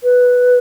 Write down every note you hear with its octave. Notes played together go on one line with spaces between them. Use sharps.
B4